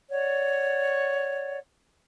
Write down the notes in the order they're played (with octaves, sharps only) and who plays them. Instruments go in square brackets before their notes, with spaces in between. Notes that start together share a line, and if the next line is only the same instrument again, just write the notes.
[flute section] C#5 D5 F#5